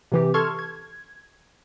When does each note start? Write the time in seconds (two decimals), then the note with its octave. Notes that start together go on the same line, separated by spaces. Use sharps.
0.12 C3 E3 G4
0.34 A4 A5 C6 C#6 F6 G#6
0.59 G#6